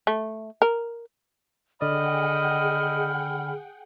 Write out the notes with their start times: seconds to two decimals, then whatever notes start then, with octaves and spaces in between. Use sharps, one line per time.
0.07 A3
0.62 A#4
1.81 D3 G#4 D5 D#5 F#5 G5 B5 F6